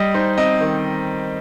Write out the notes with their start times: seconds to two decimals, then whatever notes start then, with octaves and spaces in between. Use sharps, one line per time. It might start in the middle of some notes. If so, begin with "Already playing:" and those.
Already playing: G3 D#5
0.14 D#4 C5
0.38 C4 D#5
0.61 D#3